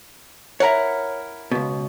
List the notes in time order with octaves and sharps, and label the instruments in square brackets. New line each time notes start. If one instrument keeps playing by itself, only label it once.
[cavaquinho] E4 A#4 F#5 [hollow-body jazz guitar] C#5 A#5
[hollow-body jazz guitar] C#2 B2